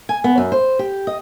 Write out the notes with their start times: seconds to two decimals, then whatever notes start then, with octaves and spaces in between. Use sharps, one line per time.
0.09 G#5
0.24 B3
0.38 F#2
0.52 C5
0.79 G4
1.07 D#5